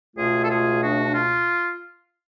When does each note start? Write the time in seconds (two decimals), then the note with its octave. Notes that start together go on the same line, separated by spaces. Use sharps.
0.16 C#2 B2 A3 F4 G#4
0.43 A4
0.48 F4 G#4
0.81 D4 F#4
1.03 D4
1.13 F4